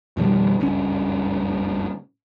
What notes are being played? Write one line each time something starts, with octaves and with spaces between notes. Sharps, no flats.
F2 B2 D#3 G3
F#1 C#2 G2 C#4